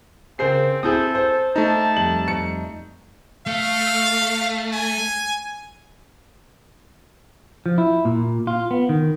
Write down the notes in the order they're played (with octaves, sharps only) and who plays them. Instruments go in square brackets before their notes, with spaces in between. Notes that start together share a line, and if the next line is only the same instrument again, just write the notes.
[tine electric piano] C#3 C7 [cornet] C4 [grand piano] G#4 A#4 C5
[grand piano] C4 E4 G#4 [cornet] A4 [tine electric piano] D#6 G6
[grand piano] C5
[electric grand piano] A3 D#4 [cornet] A5
[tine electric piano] F2 G3 [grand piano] F#7
[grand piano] C#7
[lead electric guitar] A3 [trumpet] F5
[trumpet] G#5
[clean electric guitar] F3
E4
A#2
F4
B3
D#3